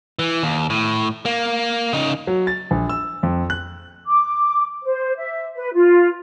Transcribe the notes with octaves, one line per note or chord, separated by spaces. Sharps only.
E3
D#2
A2
A#3
C#3 D#4
F#3
A6
A#1
E6
F2
F#6
D6
C5
E5
B4
F4